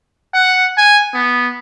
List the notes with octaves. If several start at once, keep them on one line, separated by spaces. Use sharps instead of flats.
F#5
G#5
B3